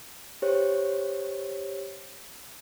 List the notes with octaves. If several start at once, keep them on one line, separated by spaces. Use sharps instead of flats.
G4 C5 C#5